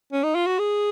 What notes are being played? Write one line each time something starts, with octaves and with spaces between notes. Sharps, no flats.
C#4
D#4
F4
F#4
G#4